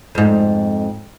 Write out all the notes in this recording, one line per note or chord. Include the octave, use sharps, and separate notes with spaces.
F2 G#2